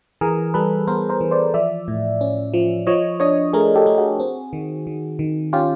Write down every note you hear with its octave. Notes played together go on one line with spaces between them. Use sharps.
E3 G#4 A#4
G3 A4 B4
B3 A#4 C5
A#4 C5
E3
C5 D5
F3 D5 E5
A2
C#4
F3
F3 C#5 D#5
D4 C#5 D#5
A3 G#4 A#4
G4 A4
A3
F#4 G#4
C4
D#3
D#3
D#3
C#4 F4 G4